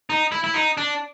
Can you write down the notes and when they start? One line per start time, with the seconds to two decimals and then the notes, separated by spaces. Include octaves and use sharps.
0.10 D#4
0.32 E4
0.44 E4
0.54 D#4
0.77 D4